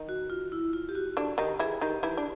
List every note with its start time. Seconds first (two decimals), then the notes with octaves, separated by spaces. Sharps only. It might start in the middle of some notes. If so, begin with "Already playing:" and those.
Already playing: D#3 D#4
0.09 F#4
0.30 F4
0.52 E4
0.73 F4
0.89 G4
0.95 F#4
1.17 D3 D4
1.38 D#3 D#4 G4
1.59 E3 E4 G#4
1.81 D#3 D#4 G4
2.03 E3 E4
2.17 D4